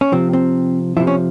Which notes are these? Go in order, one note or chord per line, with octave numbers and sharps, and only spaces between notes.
C#4
C3 F3 C4
C4
C3 F3 E4
C#4